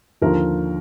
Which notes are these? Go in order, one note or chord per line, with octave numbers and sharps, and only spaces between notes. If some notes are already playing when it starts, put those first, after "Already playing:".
D#2 D3 F3 A#4